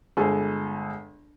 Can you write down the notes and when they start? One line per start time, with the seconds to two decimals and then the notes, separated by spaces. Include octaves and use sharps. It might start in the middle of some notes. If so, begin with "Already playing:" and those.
0.17 G1 G#3 G#4 A4